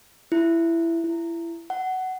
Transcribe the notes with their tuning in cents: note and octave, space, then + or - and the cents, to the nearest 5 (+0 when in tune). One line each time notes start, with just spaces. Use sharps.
E4 +15
E4 +25
F#5 +15